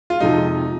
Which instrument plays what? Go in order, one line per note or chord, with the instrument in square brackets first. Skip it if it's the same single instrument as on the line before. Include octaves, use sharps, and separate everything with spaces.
[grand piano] F4
[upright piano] F2 C3 F3 G#3 [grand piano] D#4